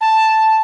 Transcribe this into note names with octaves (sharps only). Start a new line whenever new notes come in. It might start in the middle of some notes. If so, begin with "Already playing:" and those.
A5